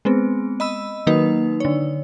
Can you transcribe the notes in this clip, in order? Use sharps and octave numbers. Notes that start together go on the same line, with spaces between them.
G#3 B3 C4
D#5 B5 E6
D#3 F#3 A#3 D#4 B4
D3 C#5